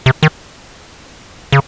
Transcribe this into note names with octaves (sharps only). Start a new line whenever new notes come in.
C3
D#3
C#3